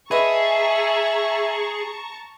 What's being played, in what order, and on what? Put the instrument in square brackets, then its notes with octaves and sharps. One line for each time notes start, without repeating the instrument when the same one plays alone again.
[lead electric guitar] G#4 [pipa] B4 D#5 [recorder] E5 [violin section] A5 A#5 C#6